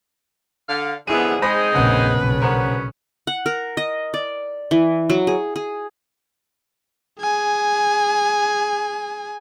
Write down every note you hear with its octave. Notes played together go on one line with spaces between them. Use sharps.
D3 F5
F2 G#2 D3 B3 E4 G#4 D#7
G#3 C4 D#4 G#4 C5 B5 A#6
A#1 F2 C#3 B4 F#5
B1 C#3
D2 B3 C#4 A#4 C5 F#5
F#5
A#4
D#5
D5
E3
F#3
G#4
G#4
G#4 G#5